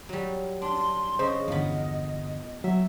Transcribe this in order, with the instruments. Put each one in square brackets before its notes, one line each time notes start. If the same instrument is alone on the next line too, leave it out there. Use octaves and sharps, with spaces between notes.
[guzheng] F#3 G3
[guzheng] D4 [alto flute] C6
[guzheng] C#3 [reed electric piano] C5 [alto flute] D#5
[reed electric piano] E2 G2 D3 [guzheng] F3 B3
[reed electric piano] F#3 [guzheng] E5